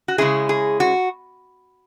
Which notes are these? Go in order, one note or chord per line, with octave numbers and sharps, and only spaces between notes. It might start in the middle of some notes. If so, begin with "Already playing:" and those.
F#4
C#3 G#3 C#4 E4 G#4
G#4
F#4